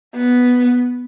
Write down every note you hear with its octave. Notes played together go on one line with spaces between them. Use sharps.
B3